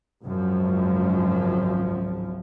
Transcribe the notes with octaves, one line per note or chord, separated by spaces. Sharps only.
G#1 C#2 F#2 F3